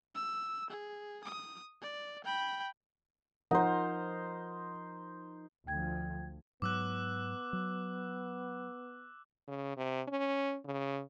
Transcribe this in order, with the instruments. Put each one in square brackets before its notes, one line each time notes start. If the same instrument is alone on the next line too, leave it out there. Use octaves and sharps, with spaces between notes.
[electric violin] E6
G#4
D#6
D5
G5 B5
[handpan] F3 A#4 [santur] D#4 C5 [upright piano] F#5
[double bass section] D2 F3 [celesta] G5 G#6
[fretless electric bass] G#2 F#3 [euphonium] B3 [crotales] D6 E6 F#6
[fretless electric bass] F#3
[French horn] C#3
C3
C#4
C#3